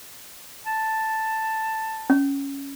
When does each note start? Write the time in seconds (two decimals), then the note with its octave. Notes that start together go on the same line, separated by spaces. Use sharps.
0.66 A5
2.10 C#4